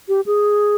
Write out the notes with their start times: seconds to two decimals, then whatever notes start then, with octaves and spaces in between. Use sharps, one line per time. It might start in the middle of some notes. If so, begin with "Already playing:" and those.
0.08 G4
0.26 G#4